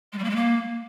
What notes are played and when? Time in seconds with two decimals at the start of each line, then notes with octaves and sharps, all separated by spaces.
0.13 G#3
0.18 G3
0.24 A#3
0.30 G#3
0.36 A#3